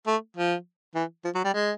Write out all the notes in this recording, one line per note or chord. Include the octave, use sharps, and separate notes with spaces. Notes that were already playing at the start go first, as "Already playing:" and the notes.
A3
F3
E3
F3
F#3
G3
G#3